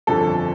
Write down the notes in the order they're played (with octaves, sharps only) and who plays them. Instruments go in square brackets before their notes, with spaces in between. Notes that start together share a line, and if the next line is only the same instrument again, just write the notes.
[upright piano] G1 F2 D3 F3 A4